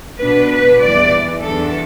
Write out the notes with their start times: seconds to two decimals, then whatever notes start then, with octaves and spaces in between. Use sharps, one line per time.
0.19 B2 B3 D4 B4
0.50 B4
0.80 E2 E3 G3 D5
1.42 E2 E3 G3 D4 A4